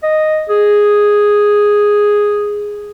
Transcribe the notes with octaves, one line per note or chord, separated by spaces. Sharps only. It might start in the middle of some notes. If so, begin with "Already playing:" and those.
D#5
G#4